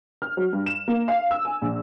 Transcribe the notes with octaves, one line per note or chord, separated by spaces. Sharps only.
F6
F#3
G2
E7
A#3
F5
E6
G#5
A#1